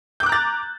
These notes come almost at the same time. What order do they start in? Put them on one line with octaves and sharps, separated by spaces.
G6 D6 F#6 A#5 A6